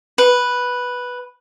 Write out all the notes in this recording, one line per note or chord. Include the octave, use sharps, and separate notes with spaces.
B4